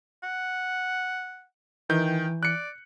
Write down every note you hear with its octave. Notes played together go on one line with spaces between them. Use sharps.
F#5
D#3 E3 G5 G6
D5 F#6 C#7